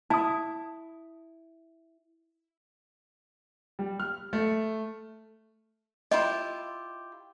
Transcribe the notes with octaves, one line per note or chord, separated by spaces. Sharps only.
E4 A5 D#6
G3
F6
A3
E4 F4 G4 D#5